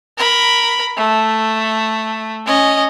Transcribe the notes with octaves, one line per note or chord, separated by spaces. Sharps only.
A#4 B5
A3
C#4 D#5